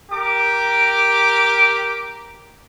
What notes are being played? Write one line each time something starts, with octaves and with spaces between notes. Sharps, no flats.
G4 A#4 D6